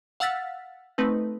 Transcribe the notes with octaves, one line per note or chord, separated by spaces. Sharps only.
F5 F#5 E6 F6 A6 B6
A3 C4 D#4 B4